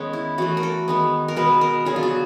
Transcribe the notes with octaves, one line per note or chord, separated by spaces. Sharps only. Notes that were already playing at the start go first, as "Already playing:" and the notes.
Already playing: D#3 G#3 B3 C#4
E4
E3 A3 F#4
A#4
A4
D#3 G#3 B3
A#4
B2 G#3 B3 B4
A#4
D3 F#3 B3 G#4
F4
F#4